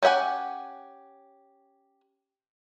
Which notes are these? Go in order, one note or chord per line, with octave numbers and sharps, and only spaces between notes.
C#4 G4 D#5 F#5 G#5